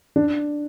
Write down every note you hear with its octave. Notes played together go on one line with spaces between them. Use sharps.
D4